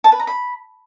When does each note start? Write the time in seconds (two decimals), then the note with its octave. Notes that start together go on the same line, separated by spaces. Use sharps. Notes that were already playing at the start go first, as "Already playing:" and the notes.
0.04 A5
0.12 B4
0.20 A#5
0.27 B5